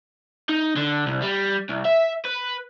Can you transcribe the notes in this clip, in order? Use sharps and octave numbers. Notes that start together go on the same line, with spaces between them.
D#4
D3
C2
G3
C2
E5
B4